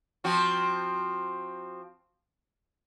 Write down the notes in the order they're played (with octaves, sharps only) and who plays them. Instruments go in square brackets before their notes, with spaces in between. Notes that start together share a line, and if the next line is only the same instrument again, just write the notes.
[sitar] F3 C4 F#4